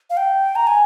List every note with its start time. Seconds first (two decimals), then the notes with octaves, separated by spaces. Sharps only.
0.10 F5
0.17 G5
0.56 A#5
0.67 G#5